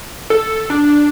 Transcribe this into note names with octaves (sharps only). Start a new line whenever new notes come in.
A4
D4